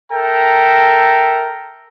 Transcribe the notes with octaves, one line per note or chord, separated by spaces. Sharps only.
A4 A#4 E5 G5 A#5